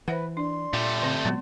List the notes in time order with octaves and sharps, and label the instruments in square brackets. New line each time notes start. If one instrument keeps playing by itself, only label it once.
[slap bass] E3 [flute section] B4 [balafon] C5 E5 F#5
[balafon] D4 [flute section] D5 C6
[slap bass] A#2 [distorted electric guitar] A3 G4
[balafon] D3 C4
[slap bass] A#2 F#3 [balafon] G#3 B3